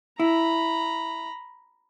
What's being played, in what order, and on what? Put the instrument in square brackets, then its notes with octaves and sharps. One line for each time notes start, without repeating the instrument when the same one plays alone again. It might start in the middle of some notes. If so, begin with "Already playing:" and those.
[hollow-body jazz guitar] E4 [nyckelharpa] A#5 B5